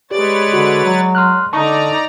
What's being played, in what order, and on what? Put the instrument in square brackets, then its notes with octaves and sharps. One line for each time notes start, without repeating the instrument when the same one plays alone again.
[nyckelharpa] G#3 D5 [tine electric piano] G4 [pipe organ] B4 C#5 A6
[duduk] D3 [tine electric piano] F#4
[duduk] F#3
[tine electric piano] C6 F6 F#6
[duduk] D3 [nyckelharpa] D#4 [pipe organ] D5 A#5 [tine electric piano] A5 C#6